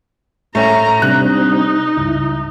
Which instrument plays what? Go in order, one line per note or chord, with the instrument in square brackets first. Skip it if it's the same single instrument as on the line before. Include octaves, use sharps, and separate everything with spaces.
[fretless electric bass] A2 [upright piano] A3 C#4 [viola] A#5
[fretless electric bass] C3 [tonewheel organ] G3 C4 D4 [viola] D#4 [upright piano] F#6
[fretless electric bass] C#2 G2 [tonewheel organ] E4